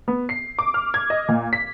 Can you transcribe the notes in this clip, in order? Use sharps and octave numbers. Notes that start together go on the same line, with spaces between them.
B3
C7
D6
F6
G#6
D#5
A#2
B6